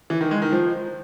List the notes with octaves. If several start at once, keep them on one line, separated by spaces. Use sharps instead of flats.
E3
D#3
G#3
D#3
F3